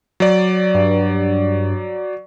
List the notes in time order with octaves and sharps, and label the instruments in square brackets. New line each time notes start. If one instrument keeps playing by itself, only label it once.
[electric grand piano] F#3 D5
[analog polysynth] G2